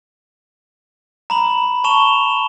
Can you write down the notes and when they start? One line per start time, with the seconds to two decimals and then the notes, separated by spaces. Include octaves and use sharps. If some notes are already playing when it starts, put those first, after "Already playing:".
1.30 A#5 B5 F#7
1.84 A5 C#6 E7 F7 G7